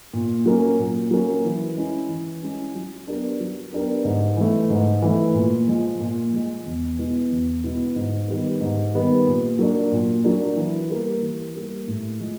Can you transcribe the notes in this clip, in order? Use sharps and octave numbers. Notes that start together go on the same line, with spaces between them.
A#2
F#3 A#3 C#4
A#2
F#3 A#3 C#4
E3
G#3 C#4 E4
E3
G#3 C#4 E4
F#3
B3 D4 G4 A#4
F#3
B3 D4 G4 A#4
G#2
E3 A3
G#2
E3 A3
A#2
F3 G#3
A#2
F3 G#3
E2
B2 G#3 B3 E4
E2
B2 G#3 B3 E4
G#2
D#3 G3 B3
G#2
D#3 G3 B3
A#2
F#3 A#3 D4
A#2
F#3 A#3 D4
E3
G3 A#3
E3
G3 A#3
A2
F3 G#3